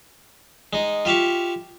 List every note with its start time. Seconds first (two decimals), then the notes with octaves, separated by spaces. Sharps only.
0.73 G#3 D#4
1.05 F4 G4 E5 F5 C#6